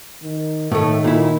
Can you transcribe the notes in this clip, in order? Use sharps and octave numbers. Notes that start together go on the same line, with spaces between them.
D#3
A2 D#3 A3
A#2 E4